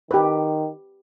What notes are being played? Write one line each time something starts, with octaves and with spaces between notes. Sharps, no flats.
D#3 G4 B4